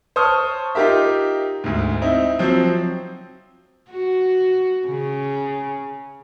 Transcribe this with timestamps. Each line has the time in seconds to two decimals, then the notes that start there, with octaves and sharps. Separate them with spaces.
0.16 C5 C#5 A5 C#6 D#6 F6
0.75 D#4 F4 G4 A#4 E5
1.64 D2 G#2
2.02 C4 D#4 E4
2.39 F3 F#3 C4
3.91 F#4
4.87 C#3